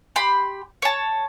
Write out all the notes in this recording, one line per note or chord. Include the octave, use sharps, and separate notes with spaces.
G4 B5 C6
C#5 A5